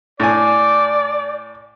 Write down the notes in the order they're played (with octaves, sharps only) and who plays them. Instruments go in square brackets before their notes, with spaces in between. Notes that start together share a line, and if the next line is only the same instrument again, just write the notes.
[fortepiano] A2 G#5 [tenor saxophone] D5